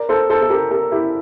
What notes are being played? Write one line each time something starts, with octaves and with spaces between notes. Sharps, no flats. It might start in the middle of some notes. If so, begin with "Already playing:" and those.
Already playing: A#4 D5
A4 C5
A4 C5
A4
G4 A#4
G4 A#4
E4 G4